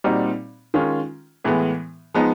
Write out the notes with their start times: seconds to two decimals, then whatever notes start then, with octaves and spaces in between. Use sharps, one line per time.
0.04 A#2 G3 C4 D#4 F#4
0.74 D#3 G#3 C#4 F4
1.44 A2 E3 G#3 B3
2.14 F3 G#3 B3 D#4